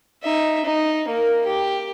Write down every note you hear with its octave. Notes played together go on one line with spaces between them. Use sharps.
D#4 E5
D#4
A#3 A#4
G4